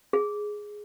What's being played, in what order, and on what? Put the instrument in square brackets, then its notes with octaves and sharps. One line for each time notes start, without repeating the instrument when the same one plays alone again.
[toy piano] G#4